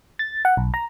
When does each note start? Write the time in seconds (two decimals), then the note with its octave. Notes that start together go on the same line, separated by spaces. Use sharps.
0.19 A6
0.45 F#5
0.57 B1
0.74 A#5